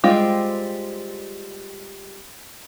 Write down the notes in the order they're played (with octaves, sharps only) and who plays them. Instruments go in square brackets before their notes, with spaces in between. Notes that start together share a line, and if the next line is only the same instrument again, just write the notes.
[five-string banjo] G3 G#3 C4 F4 G5